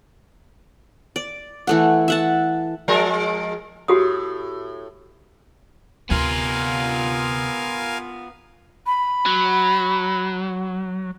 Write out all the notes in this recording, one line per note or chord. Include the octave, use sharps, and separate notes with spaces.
D5
E3 A3 F#5
E5 F#5 A5
F3 G#3 A#4
A2 F#4 G4 D#6
D2 C3 B3 F4 A#4 F5 G#5
B5
F#3